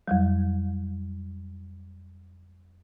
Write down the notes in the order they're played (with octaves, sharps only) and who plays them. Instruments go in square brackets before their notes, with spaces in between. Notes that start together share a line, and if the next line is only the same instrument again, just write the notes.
[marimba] F2 F#3 G3